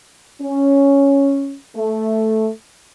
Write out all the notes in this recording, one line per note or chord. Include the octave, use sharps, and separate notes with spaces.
C#4
A3